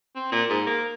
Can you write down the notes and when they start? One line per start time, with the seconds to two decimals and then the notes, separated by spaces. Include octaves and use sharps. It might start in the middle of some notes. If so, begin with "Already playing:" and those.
0.15 C4
0.32 A#2
0.49 G#2
0.67 A#3